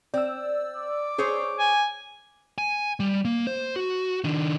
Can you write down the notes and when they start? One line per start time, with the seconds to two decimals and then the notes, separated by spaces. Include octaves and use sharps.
0.14 C4 D5 E6
0.77 D6
1.18 G#4 C5 C#5
1.59 G#5
2.58 G#5
3.00 G3
3.25 A#3
3.47 C5
3.76 F#4
4.24 D#3 D4